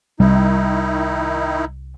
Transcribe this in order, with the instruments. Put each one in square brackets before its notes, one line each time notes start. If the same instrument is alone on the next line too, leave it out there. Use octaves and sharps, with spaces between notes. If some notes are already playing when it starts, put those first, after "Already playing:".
[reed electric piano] C2 [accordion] D#3 D#4 E4 [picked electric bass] G3